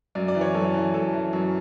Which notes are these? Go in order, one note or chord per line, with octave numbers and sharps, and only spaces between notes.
F#2 D5
D5
E3
C#5
F#2 A4
E3
F#2 A4
E3
F#2